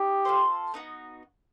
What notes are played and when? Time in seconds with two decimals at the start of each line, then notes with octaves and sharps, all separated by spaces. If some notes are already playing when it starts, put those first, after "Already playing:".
Already playing: D#4 G4
0.25 F4 A4 C5
0.74 B3 D#4 F#4